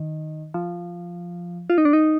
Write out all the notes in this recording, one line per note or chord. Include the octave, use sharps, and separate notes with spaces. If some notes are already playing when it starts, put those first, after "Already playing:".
Already playing: D#3
F3
F4
D#4
D4
D#4